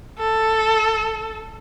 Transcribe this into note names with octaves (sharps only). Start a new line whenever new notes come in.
A4